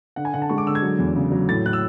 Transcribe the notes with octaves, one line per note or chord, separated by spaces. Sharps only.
D3 F#5
G#5
D3 F#5
A5
G#3 C#6
D6
D3 E6
G#6
F#3
E2
C#3
F#3
A2 A6
A2 F#6
E6